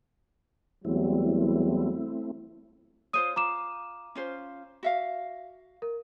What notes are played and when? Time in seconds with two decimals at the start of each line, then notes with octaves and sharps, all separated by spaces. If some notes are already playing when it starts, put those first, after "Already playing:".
0.85 E2 F#3 G3 A3 C4 E4
3.13 F4 C5 C#5 D#6 D#7
3.36 F4 A#5 D6 E7
4.15 C#4 F4 C5
4.83 F#4 E5 F5
5.82 A#4